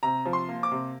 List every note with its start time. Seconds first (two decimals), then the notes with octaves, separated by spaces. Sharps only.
0.03 C3 A#5
0.25 F3
0.33 C6
0.49 A#3
0.63 D6
0.72 C3